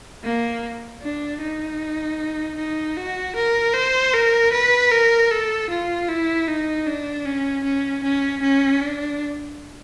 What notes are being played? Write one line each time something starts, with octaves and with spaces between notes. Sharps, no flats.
A#3
D4
D#4
D#4
F#4
A#4
C5
A#4
B4
A#4
A4
F4
E4
D#4
D4
C#4
C#4
C#4
C#4
D4